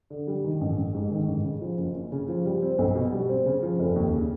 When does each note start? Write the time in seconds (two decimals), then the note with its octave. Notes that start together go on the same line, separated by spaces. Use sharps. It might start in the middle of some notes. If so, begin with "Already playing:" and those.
0.10 D3
0.27 G3
0.44 D#3
0.61 A1
0.77 A1
0.94 G#2
1.12 D#3
1.28 A1
1.44 C#3
1.61 F3
1.78 F#1
1.95 F#2
2.12 C#3
2.28 F3
2.45 G3
2.62 C4
2.79 B1
2.95 B2
3.12 G3
3.29 C4
3.46 C#3
3.63 F3
3.79 F1
3.96 D#2
4.13 C#3